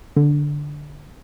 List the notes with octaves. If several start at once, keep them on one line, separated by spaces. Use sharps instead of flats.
D3